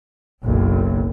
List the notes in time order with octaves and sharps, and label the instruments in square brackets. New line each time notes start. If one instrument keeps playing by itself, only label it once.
[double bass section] F#1 B1